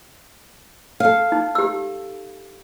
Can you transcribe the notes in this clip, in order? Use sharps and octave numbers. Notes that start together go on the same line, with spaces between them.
A4 F5
D#4
G4 E6